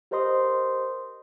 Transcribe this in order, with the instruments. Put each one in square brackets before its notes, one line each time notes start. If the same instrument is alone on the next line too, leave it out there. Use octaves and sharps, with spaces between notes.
[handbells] G4 A#4 C5 D#5 C6 D#6